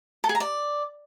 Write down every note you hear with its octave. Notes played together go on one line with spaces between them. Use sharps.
A4
G#4
A#5
D5